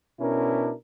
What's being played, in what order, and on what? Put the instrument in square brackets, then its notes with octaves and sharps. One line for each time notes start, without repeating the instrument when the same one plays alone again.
[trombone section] B2 C#4 D4 E4 A#4